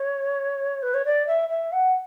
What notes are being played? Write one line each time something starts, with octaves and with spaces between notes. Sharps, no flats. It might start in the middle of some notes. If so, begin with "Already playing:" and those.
Already playing: C#5
B4
C#5
D5
E5
E5
F#5